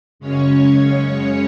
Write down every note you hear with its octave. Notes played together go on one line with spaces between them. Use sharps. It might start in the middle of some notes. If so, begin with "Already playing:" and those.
F#2 C#3 G#3 C#4 C#5
C#4 C#5
C#4 C#5